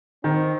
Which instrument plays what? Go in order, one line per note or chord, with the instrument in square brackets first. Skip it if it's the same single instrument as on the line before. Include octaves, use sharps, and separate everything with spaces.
[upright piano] D#3 [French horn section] C4